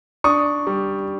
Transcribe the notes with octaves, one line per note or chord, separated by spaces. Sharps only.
D4 C#6 D#6
G3